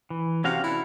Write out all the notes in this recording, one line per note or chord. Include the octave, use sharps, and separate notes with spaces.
E3
C3 C#4 F#4 F5
D4 E4 A4